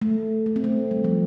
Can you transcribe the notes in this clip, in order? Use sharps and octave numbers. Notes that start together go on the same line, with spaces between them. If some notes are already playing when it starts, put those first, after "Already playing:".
A3
A3
C4
A3
G3
F3